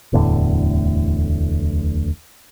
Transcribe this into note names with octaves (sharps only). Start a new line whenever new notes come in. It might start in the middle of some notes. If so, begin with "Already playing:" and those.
D1 E2 A2 D3